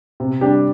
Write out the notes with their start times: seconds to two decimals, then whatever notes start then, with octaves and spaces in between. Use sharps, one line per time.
0.20 C3
0.41 G3 D4 G4